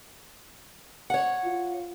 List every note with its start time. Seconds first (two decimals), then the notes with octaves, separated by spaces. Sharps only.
1.10 C#5 F#5
1.45 F4